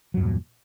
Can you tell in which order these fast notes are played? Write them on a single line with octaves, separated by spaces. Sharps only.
F#3 G2 E2 A#2